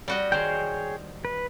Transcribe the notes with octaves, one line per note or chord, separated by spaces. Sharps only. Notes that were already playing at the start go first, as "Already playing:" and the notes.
G3 F#4 D#5
D#3 G#4 C5 C#5 G5
B4